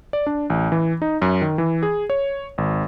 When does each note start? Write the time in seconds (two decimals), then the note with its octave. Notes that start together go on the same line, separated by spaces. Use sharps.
0.13 D5
0.27 D4
0.50 A1
0.72 E3
1.02 D#4
1.22 F#2
1.42 D#3
1.58 E3
1.83 G#4
2.10 C#5
2.58 G#1